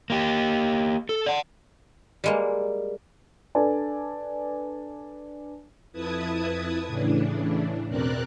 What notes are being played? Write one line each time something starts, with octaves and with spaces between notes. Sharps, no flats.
A#3 G4
A4
D5 F#5
G3 G#3 A#3
D4 A4 B4 D5 G#5 A5
F2 E4 B4 A5 D#6 G#6
A2 C#3 E3 D4
E2 B2 C4 A#4 D5 F#6